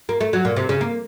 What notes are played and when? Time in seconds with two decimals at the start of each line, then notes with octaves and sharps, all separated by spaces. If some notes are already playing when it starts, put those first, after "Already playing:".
0.09 A#3
0.21 A3
0.33 F#3
0.45 A#2
0.56 C3
0.69 C#3
0.81 A#3